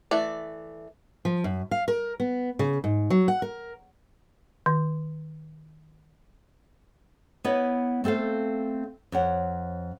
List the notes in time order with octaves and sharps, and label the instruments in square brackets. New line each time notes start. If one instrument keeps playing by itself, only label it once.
[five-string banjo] E3 A3 D5
[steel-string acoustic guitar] F3
F#2
F5
A#4
B3
C#3
G#2
F#3
F#5
A#4
[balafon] D#3
[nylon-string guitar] B3 E4 B4 C#5 D#5
A3 C4 A4 C5 F5
F2 C#5 F#5